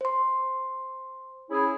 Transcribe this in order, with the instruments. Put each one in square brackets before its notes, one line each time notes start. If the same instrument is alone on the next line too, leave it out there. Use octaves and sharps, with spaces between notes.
[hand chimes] C5 C6
[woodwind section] C#4 E4 G#4